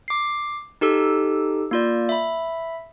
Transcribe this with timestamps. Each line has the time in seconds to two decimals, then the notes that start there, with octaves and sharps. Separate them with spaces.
0.08 D6 C7
0.81 D#4 G4 A4 E6
1.71 A#3 F4 D5
2.09 E5 B5